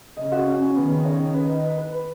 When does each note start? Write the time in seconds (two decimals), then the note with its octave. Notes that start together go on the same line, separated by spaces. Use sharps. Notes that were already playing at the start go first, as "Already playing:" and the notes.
0.17 C#3 D#5
0.32 F#4
0.46 C#4
0.61 C#4
0.76 D#3 B3
0.90 C#3
1.05 C#5
1.20 C#3
1.34 B4
1.49 D#5
1.64 B4
1.78 B4
1.92 B4